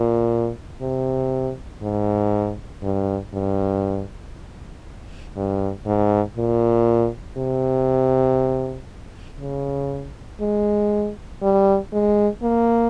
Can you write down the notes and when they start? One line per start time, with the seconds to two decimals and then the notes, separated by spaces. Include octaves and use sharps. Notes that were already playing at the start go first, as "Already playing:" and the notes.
Already playing: A#2
0.82 C3
1.82 G#2
2.83 G2
3.34 G2
5.36 G2
5.86 G#2
6.37 A#2
7.38 C3
9.40 C#3
10.41 G#3
11.42 G3
11.93 G#3
12.42 A#3